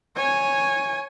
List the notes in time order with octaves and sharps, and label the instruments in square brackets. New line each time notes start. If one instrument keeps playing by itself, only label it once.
[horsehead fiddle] C#5 G#5